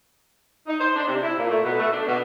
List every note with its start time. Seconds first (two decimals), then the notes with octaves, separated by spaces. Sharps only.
0.67 D#4
0.80 C5
0.96 D4
1.08 C3
1.23 E4
1.38 A#2
1.51 A3
1.65 B2
1.79 A3
1.93 D4
2.07 B2